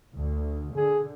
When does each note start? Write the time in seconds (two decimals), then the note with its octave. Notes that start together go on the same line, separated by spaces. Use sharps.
0.14 D2
0.76 D3 G#4